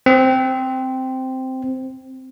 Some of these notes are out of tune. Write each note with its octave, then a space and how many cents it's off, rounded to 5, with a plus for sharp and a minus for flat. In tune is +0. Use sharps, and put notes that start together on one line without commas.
C4 -5